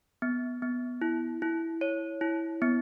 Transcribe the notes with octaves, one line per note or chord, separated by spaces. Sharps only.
B3
B3
E4
E4
C#5
E4
B3